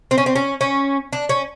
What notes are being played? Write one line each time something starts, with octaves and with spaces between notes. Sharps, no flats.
C4
C#4
C4
C#4
C#4
D4
C#4